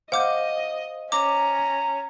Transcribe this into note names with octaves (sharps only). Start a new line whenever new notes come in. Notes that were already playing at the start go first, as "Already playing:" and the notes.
C5 D#5 F5 F#5 D6 G6
C#4 A#5 D6